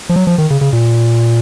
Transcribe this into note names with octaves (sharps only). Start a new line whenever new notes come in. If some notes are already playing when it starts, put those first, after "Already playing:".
F3
F#3
F3
D#3
C#3
C#3
A#2